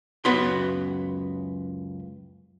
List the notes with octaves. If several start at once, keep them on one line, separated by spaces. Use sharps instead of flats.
C#2 F#2 B3 F#4 B5 C6